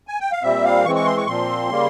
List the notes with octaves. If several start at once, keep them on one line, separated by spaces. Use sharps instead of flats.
G#5
G5
F5
A#2 G3 C4 E5
F5
E3 G#3 C4 C#6
C#6
C6
C#6
A#2 F3 C4 C6
C#3 G3 A#3